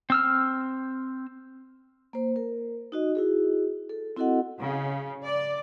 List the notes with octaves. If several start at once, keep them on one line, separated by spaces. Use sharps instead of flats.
C4 E6 F6
A#3 C5
A#4
D#4 F#4 D#5
E4 F#4 G#4
A4
C4 E4 F#4 A4 D#5 F#5
C#3
D5